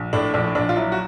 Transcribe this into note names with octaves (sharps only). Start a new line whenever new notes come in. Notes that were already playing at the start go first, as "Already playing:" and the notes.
Already playing: A#1
A2 D4
A#1 D4
A#1 D4
F4
F#3 E4
F#4